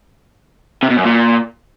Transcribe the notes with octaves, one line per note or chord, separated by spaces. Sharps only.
C3
B2
F#2
A#2